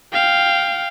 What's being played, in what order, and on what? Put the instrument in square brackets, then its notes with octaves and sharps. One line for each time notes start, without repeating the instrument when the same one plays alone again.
[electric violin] F5 G5